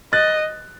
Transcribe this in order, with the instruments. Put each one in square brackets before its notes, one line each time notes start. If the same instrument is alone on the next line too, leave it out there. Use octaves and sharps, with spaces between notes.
[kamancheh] D#5 [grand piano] F#6 A6